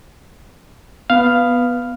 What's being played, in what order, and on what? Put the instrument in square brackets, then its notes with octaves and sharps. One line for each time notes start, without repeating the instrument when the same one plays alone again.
[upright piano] B3 [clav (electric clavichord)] F5